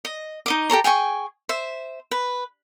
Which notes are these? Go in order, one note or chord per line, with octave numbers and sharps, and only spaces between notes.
D#5
D#4 D#5 D6
G4 A4 C#5 A#5
G#4 G5 G#5 C#6
C5 E5
B4